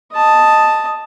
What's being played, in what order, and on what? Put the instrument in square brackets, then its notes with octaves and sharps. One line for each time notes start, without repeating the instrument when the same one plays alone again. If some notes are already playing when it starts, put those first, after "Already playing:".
[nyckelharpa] D#5 A5